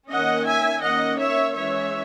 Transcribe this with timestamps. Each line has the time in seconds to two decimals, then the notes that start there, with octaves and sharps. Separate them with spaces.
0.10 D#3 A#3 C#4 D#5 F#5
0.47 E5 G#5
0.82 D#3 A#3 C#4 D#5 F#5
1.18 C#5 E5
1.54 E3 G#3 C#4 C#5 E5